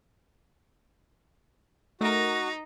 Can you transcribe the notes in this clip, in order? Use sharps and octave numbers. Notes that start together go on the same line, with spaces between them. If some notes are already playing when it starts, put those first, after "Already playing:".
A3 D#4 F#4 A#4 A#5